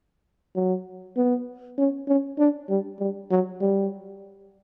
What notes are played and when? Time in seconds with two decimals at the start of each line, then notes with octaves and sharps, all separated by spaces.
0.55 F#3
1.17 B3
1.78 C#4
2.08 C#4
2.39 D4
2.69 G3
3.00 G3
3.30 F#3
3.61 G3